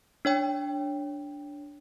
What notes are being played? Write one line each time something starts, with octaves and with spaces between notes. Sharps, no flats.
D4 C#5 G5